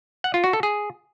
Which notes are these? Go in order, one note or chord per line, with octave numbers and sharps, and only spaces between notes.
F#5
F4
F#4
A4
G#4